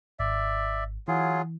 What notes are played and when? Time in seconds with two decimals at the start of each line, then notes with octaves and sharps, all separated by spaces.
0.19 G#1 D5 E5
1.08 E3 F#3 F4 G#4